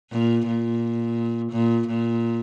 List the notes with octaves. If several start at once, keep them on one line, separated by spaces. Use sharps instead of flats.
A#2
A#2
A#2
A#2